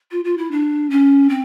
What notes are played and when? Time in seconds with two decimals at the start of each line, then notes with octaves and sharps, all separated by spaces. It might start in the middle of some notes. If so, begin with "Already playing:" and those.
0.11 F4
0.25 F4
0.38 E4
0.51 D4
0.90 C#4
1.29 C4